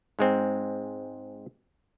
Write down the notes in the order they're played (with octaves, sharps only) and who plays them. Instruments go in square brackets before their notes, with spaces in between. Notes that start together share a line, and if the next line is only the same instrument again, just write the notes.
[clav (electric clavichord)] G#2 G#3 C4